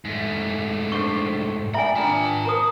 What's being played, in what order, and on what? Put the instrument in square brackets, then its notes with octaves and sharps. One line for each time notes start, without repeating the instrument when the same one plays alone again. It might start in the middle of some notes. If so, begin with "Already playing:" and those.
[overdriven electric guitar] G#2 A3
[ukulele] D4 C5 [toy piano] C#6
[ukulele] D5 G5 A#5 [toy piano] E5 G#5 [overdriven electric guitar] B5
[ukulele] D4 D#4 F4 [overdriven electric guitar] B4 A5
[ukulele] A#4 C5 [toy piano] A#5 D#6